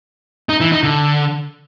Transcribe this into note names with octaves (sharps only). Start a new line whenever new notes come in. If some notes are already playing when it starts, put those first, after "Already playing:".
D#4
E3
D#4
D3